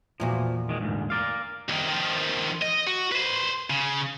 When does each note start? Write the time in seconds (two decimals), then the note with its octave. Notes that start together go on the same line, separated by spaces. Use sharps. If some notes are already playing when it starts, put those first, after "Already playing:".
0.20 E2 A#2 F3 F#4
0.69 D#3 G#3
0.81 D2 G#2
1.10 A#4 D5 F5
1.69 C2 D#3
1.88 D#3 F3
2.62 D#5
2.87 F#4
3.12 B4 C5
3.70 C#3